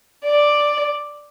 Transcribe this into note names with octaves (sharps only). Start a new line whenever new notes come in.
D5